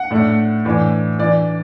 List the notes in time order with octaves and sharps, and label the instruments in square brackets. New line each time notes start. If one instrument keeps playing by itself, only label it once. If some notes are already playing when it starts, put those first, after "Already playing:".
Already playing: [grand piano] F#5
A2 A3 D4
A2 E3 D4
E3 D4 D5